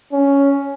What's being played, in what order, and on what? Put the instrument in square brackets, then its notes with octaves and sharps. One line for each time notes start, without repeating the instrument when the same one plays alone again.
[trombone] C#4